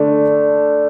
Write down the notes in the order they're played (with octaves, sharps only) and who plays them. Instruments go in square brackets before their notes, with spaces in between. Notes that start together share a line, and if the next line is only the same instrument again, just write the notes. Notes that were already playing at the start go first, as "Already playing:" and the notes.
Already playing: [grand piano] D3 A3 D4